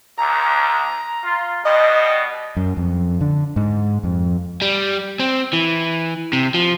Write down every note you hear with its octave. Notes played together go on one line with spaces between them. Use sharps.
D2 A#5
F4
B2 G3 D#5
F#2
F2
D3
G#2
F2
G3
C4
E3
C3
F3